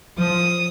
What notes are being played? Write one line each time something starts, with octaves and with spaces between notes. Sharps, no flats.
F3 D#6